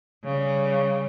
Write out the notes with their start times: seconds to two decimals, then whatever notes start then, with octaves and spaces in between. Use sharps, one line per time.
0.24 C#3 G3